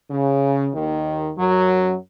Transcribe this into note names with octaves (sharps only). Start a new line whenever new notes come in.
C#3
D#2 D#3
F#2 F#3